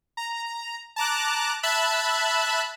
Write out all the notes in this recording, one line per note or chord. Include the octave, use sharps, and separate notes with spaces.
A#5
A5 A#5 D6 F#6
E5 A5 B5 E6 F#6